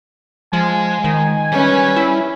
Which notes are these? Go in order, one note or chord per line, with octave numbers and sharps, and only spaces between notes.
F3 G#3 G#5
D#3
G3 C#4 B4
E4